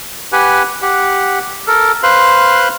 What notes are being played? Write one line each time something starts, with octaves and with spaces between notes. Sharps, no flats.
G4 B4 F#5 G#5
G4 F#5
A4 A#4
B4 C5 F5 C6 F#6